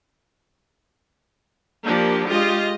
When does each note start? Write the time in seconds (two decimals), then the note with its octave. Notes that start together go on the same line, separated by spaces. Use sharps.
1.85 F3 A#3 D4 G4
2.28 G#3 F4 G4 D#5